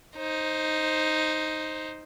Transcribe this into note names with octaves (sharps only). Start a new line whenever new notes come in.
D#4 C5